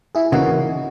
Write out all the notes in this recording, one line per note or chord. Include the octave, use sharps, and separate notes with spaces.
E4 G#4
G#4
C#3 E3 A#3 D#4 F#4